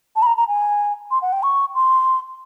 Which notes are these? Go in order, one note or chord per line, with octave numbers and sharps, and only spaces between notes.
A5
B5
A#5
A#5
G#5
C6
F#5
G5
C#6
C6